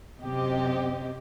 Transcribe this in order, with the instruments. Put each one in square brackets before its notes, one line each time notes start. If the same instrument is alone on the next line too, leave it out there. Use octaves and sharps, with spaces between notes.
[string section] F#2 C3 G4 D#5